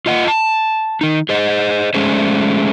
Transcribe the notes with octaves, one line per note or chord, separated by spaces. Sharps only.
F4 D#5 F#5
A5
D#3 D#4
G#4 C5 D#5
G#3 A3 C#4 G#4 C5